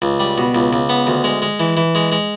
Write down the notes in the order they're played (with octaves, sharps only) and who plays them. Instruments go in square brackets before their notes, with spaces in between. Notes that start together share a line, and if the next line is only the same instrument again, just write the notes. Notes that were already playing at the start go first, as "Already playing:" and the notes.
[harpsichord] C#2
G3
B2
C#2
C#2
B3
D2
G#3
G#3
E3
E3
G#3
G#3